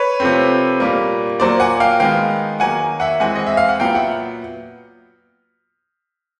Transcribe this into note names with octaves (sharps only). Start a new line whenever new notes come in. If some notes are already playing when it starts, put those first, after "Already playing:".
Already playing: B4 C#5
C3 F3 A3 C4
A#2 G3 A#3
A#2 F#3 A#3 C5 D5
F#5 G#5
F5 G5
D#3 G#3 B3 F5 G5
D#3 F#3 A#3 F#5 G#5
E5 F#5
E3 G#3 C4 F#5 G#5
D#5
E5
F5
F#5
A#2 F#3 B3 F5 G5
E5 F#5